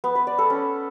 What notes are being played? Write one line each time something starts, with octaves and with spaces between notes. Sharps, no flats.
B3
B4
D5
A4
C#4